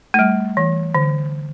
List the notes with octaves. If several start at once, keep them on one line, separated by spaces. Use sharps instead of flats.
A3
G3
E3
D3